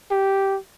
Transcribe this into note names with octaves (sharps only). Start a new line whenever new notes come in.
G4